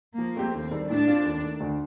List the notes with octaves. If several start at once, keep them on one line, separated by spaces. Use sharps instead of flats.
F3 A#3
A3 C4 G4
D#2 C4
D#3 G3 D4 A4
A2 D4
A3 C4 F4
D#2
D#3 A3
D2